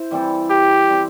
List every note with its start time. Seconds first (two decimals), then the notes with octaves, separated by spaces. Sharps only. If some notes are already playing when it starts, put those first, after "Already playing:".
Already playing: E4 C5
0.11 E3 G3 C4 A4
0.50 G4
0.89 G3 C4 A4 C5